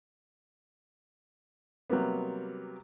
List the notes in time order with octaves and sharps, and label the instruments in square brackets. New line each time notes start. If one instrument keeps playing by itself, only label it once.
[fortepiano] C3 F#3 G3 A#3 B3